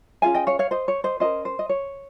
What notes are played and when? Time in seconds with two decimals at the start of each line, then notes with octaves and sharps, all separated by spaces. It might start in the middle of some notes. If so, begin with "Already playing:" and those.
0.22 C#4 F4 G#4 F5 G#5
0.34 D#5 G5
0.47 C#5 F5
0.59 C#5 F5
0.71 C5 D#5
0.88 C#5
1.04 C5 D#5
1.20 C#4 G4 A#4 C5 D#5
1.45 C5
1.59 D#5
1.69 C#5